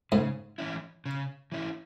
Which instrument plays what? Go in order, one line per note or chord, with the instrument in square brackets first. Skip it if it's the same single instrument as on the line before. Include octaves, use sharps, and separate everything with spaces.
[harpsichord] G#2 [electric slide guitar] C#3
[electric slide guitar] E3 C#4 E4
C#3
E3 C#4 E4